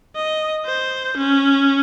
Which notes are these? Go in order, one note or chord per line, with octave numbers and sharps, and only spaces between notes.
D#5
C5
C#4